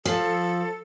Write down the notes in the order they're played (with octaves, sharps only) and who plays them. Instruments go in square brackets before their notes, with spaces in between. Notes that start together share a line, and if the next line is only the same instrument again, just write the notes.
[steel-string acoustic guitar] F3 [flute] A4